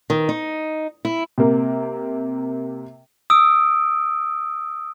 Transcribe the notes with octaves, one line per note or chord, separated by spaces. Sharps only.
D#3
D#4
E4
C3 A#3
D#6 E6 D7